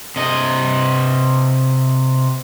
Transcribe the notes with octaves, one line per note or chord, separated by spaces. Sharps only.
C3 D#5